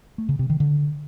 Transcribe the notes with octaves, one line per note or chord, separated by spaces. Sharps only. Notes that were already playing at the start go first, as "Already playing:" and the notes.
A3
C#3
C3
D#3
D3